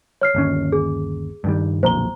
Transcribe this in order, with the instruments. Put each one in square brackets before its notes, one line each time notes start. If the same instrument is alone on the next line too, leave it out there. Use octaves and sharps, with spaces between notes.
[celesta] C#5 F6 C7
[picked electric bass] G1 D#2 C#4
[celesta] G#4
[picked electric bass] G2 D#3 G3
[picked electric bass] B1 F2 A#2 [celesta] C5 A#5 G7